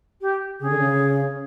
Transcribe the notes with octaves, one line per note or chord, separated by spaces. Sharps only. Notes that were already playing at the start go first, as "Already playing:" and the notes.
G4
C#3 G#4
D3
C#3